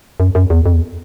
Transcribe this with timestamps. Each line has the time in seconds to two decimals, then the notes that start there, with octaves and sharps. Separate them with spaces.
0.20 F#2
0.35 F#2
0.50 E2
0.66 F2
0.74 E2